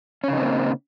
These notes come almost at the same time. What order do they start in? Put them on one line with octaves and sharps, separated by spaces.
C#4 C#3 D#4 C4 A#3